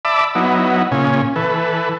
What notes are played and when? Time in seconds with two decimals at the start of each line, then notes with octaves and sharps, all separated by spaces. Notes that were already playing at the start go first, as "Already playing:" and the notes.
0.05 D5 E5 A5 B5 D6 E6
0.35 F#3 B3 D#4 E4
0.92 A#2 C#3 C#4
1.36 E3 A4 B4